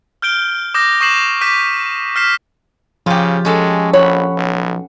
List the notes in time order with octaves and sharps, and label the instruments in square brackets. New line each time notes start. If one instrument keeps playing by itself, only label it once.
[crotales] F6 G6 D7 G7
D6 D#6 G6 A#6
C#6 D#6 G6 C7 E7 F#7
D6 G6 B6 D#7
F6 G6 B6 C7 E7
[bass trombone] C#3 [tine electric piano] F3 [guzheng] F4 G4
[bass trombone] G#3 [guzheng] C#4 A4 A5
[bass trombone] A#1 [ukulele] C#5 [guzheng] F#5 B5
[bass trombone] B1